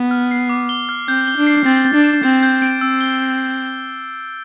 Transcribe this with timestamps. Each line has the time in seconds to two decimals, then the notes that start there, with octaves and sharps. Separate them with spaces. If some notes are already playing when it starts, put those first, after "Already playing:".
Already playing: B3
0.11 F6
0.31 C7
0.49 D6
0.69 G7
0.89 F6
1.08 C4 G6
1.28 G7
1.37 D4
1.47 C7
1.65 C4 A6
1.85 A6
1.94 D4
2.04 E7
2.23 C4 G6
2.43 G6
2.62 D7
2.81 C4 E6
3.01 G7